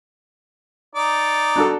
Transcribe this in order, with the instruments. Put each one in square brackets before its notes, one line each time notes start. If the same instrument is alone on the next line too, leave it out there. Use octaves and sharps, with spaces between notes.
[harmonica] D#4 D5
[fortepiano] D4 F#4 A4